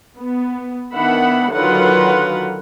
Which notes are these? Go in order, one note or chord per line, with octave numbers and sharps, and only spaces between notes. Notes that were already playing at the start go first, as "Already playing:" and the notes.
B3
D#3 B3 D4 E5 F#5 B5
D3 D#3 F#3 F4 B4 F#5